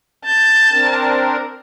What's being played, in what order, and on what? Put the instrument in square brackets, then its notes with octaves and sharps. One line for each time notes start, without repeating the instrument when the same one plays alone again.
[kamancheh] A5 [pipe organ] G6
[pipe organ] C4 D4 A#4